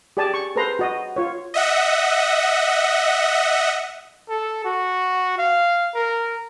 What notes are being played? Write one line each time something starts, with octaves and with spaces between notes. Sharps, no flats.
G4 G#4 D5 G#5 A5
C#6
G#4 A4 B4 C5 A#5 C6
F#4 D#5
F4 C#5
D#5 E5 F#5
A4
F#4
F5
A#4